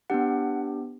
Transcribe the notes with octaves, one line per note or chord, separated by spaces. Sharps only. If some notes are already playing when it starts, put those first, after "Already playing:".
B3 D4 G4 F#5